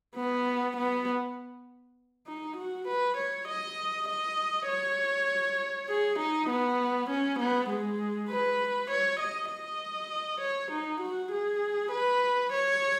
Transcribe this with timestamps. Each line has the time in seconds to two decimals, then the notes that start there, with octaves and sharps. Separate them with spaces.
0.16 B3
0.77 B3
2.27 D#4
2.57 F#4
2.88 B4
3.18 C#5
3.48 D#5
4.09 D#5
4.68 C#5
5.89 G#4
6.19 D#4
6.50 B3
7.10 C#4
7.40 B3
7.70 G#3
8.30 B4
8.91 C#5
9.21 D#5
9.51 D#5
10.41 C#5
10.72 D#4
11.01 F#4
11.32 G#4
11.92 B4
12.53 C#5